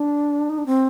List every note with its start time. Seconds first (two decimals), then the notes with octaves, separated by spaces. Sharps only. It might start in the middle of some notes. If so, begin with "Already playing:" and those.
Already playing: D4
0.49 D#4
0.58 D4
0.66 C4